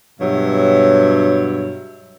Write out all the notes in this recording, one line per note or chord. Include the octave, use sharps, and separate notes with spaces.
G2 B2 F#3 C#5 E5